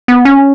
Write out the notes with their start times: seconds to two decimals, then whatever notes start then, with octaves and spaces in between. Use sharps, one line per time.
0.08 B3
0.25 C#4